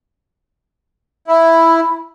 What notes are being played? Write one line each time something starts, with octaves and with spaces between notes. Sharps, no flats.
E4 B5